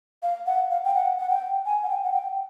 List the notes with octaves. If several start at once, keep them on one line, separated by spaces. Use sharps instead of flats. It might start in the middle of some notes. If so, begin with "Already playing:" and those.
F5
F#5
F5
G5
F#5
F#5
G5
G#5
F#5
G5
F#5
G5